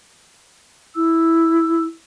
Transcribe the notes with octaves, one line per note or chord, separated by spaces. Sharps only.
E4 E6